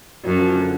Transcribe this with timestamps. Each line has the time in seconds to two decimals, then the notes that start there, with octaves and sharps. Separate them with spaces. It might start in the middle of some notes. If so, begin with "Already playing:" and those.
0.24 F#2 F#3
0.39 F3
0.55 D3